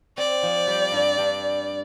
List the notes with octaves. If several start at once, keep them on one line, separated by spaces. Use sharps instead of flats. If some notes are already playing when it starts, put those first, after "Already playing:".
C4 D5
F3
G3
G2
G2